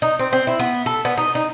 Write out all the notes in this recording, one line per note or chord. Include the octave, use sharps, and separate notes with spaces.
D#4
C4
C4
E4
B3
A4
B3
D#4
D#4